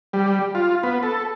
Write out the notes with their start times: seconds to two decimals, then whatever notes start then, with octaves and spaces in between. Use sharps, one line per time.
0.13 G3
0.55 F4
0.83 B3
1.03 A4